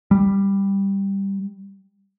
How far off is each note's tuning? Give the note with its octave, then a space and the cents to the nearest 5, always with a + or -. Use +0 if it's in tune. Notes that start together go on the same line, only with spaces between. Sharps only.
G3 +5